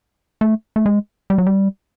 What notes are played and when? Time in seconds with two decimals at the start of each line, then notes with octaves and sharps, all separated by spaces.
0.41 A3
0.76 A3
0.86 G#3
1.30 G3
1.38 F#3
1.47 G3